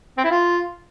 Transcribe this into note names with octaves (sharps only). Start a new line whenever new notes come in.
C4
E4
F4